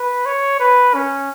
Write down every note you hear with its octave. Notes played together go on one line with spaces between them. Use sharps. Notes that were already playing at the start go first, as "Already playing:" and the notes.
Already playing: B4
C#5
B4
C#4